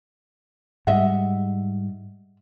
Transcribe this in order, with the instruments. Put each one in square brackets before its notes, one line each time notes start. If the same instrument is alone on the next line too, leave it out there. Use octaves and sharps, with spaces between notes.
[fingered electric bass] G#2 G3 G#3 [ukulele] D#5 E5 F#5